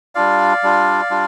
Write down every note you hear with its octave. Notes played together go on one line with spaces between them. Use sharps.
G3 D4 F4 D5 F5
G3 D4 F4
G3 D4 F4